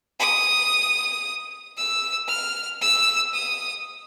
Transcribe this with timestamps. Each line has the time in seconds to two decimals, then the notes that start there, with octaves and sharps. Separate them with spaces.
0.20 D#6
1.77 E6
2.28 F6
2.81 E6
3.34 D#6